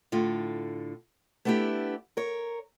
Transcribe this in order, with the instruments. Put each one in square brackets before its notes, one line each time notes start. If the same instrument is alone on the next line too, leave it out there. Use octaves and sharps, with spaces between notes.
[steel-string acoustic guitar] A2 D3 F4
A3 B3 D4 E4 G4
A#4 C#5